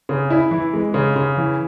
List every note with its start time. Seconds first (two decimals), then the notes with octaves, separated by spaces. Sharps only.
0.09 C#3
0.30 E4
0.51 E3
0.74 G#3
0.94 C#3
1.16 C#3
1.37 E3